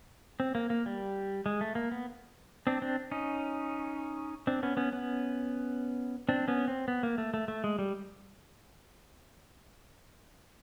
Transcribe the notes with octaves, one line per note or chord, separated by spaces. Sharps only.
C4
A#3
A#3
G3
G#3
A3
A#3
B3
C4 D4
C4 D4
C#4 D#4
C4 D4
B3 C#4
B3 C#4
B3 C#4
C4 D4
B3 C#4
C4
B3
A#3
A3
A3
A3
G#3
G3